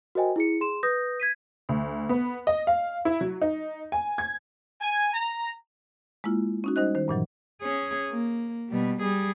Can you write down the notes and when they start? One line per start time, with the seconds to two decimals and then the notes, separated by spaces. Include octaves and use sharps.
0.15 F#4 A#4 C5 D#5 G5 G#5
0.36 E4 G#4 C#7
0.61 G#4 C6 E7
0.83 B4 D#6 G6 A#6
1.20 G#6 B6 D#7
1.69 D2
2.09 B3
2.47 D#5
2.67 F5
3.05 E4
3.21 F#3
3.42 D#4
3.92 G#5
4.18 G#6
4.81 G#5
5.14 A#5
6.24 G#3 A#3 E4 F4
6.64 C#4 D#4 F#4
6.76 G3 D#4 C5 D#5 F#6
6.95 D#3 C5
7.08 G2 A#2 E3 F#3
7.62 C#4 G#4
8.10 A#3
8.69 B2 G3
9.00 G3 G#4